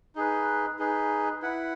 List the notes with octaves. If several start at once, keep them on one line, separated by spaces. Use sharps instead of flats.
D#4 G#4 B4
D#4 G#4 B4
E4 B4 F#5